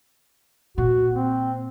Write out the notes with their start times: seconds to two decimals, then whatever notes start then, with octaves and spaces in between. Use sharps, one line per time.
0.78 A#2 F#4
1.13 C4